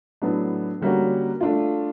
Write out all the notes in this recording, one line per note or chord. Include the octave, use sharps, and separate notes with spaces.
A2 F#3 B3 D4
D3 G3 A#3 C#4 F#4
A3 D4 F4